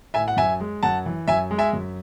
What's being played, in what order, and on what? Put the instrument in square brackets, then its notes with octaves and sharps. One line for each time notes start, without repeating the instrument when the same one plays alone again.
[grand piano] A2 E5 G#5
F#5
F#2 E5 G#5
G#3
F#2 F#5 A5
E3
F#2 E5 G#5
G#3
E5 G#5
F#2